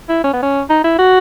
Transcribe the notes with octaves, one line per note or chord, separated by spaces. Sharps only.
E4
C#4
B3
C#4
D#4
E4
F#4